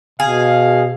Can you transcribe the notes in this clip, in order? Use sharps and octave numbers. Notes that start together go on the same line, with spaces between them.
B2 G#4 F5